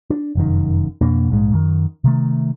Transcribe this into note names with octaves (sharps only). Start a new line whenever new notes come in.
D4
F1 F#2 D#3
F2 B2 A#3 D4
A#1 G#2 C3 G#3
F#2 D#3
C3 D#3 A3